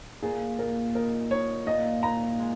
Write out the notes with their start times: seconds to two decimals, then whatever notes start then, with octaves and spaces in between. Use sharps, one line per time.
0.23 A#2 G#4
0.59 A#2 A#4
0.95 D#4 A#4
1.31 D#4 C#5
1.67 A#2 D#5
2.03 A#2 A#5
2.39 G#3